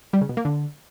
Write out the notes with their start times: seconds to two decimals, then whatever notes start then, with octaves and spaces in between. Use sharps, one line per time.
0.13 G3
0.21 C#3
0.29 B2
0.37 A#3
0.45 D3